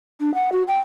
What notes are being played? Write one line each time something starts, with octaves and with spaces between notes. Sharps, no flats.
D4
F#5
F#4
G5